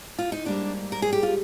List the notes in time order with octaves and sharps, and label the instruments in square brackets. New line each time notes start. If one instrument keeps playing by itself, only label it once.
[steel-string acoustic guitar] F4
D#4
G#2 G3 A#3 D4
A#4
G#4
G4
F4